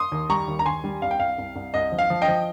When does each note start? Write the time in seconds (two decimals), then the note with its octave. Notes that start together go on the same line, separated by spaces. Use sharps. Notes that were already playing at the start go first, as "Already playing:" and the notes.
Already playing: C6 D#6
0.12 D#2
0.29 G3 A#5 C#6
0.48 D#2
0.59 A#5
0.66 D#2 G#5 C6
0.84 G3
1.02 C2 F5
1.11 G5
1.20 C2 F5
1.38 C2
1.56 C2
1.74 C2 D#5
1.92 F3
1.98 F5
2.10 F3
2.22 D#5 G5
2.28 F3